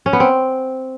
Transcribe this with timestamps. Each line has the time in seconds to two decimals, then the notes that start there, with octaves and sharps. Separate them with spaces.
0.06 C#4
0.13 B3
0.20 C4